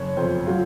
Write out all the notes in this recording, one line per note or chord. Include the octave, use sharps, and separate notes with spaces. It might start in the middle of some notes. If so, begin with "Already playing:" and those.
Already playing: F#1 C#5
F2 C5
F#3 F4